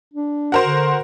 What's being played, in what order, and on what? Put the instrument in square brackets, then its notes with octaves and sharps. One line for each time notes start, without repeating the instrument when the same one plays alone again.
[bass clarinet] D4
[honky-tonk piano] F#4 A#4 C5
[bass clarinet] D3